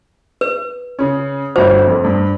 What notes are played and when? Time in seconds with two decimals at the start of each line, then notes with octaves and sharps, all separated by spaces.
0.41 B4
0.99 C#3 C#4
1.56 G1 F#4 C5
1.87 F2
2.04 G2